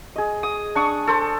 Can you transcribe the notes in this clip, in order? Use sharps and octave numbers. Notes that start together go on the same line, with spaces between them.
G#4 D#5
D#6
D4 C#6 D#6
A4 C5